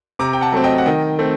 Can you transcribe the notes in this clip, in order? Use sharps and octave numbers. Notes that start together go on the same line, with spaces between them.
C3 A#5 D6
G5
F#5 A5
F#3 A3 C4
D#5 G5
F#5
D#3 D#5 G5
A3 C4